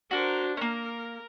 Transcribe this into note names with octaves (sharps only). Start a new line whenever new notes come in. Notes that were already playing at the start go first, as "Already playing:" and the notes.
D4 F#4 A#4 C5
A#3 C#4 A#4